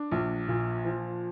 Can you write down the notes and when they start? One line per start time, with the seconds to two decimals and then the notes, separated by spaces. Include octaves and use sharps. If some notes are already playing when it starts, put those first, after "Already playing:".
Already playing: D4
0.12 A#1
0.48 A#2
0.85 F3